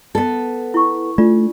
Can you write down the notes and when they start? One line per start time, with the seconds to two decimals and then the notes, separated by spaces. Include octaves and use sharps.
0.15 B3 A4
0.74 E4 C#6
1.18 A3 D4 F4 D5